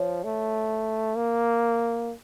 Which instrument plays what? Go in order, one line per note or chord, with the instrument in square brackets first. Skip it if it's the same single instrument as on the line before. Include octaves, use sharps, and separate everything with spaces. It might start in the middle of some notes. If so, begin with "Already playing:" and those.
Already playing: [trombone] F3 [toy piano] C#5
[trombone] A3
A#3